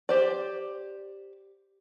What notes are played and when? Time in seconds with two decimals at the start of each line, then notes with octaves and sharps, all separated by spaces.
0.09 G4 C5 D5